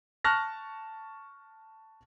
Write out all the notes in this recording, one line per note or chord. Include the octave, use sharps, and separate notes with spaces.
A5 C#6 F6 F#6 A#6